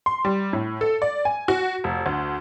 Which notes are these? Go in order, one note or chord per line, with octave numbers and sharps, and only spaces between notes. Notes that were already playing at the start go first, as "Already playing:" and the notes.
C6
G3
A2
A4
D5
G#5
F#4
F1
D2